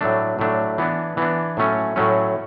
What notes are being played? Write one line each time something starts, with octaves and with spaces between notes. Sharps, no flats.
A2 F#3 A3 D4
A2 F#3 A3 D4
E3 B3 D4
E3 B3 D4
A2 F#3 A3 C#4
A2 F#3 A3 C#4